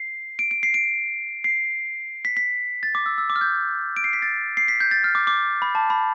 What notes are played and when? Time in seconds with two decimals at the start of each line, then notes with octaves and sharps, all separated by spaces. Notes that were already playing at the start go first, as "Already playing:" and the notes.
Already playing: C7
0.39 D7
0.51 D7
0.63 C7
0.74 D7
1.44 C7
2.25 B6
2.37 B6
2.83 A6
2.95 D6
3.06 E6
3.18 E6
3.30 D6
3.36 F6
3.41 G6
3.97 D7
4.04 C7
4.13 B6
4.22 A6
4.57 C7
4.68 B6
4.80 G6
4.91 A6
5.04 F6
5.15 D6
5.27 D6
5.62 B5
5.75 A5
5.90 B5